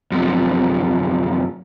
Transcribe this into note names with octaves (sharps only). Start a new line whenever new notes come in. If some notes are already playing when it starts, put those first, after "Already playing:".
F#2 C3 F3